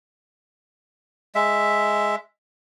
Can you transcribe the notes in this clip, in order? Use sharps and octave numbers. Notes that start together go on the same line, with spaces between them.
G#3 E5